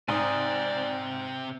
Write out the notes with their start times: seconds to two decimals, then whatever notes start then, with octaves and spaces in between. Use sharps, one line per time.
0.08 G#2 C3 C4 D5 G#5 C6 D#6